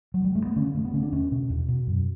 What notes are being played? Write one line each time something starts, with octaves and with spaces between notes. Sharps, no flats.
F#3
G3
G2 A3
B3
D3 C#4
G2 A3
B3
D3 C#4
D4
E2 C#4
B2
E2
B2
F#2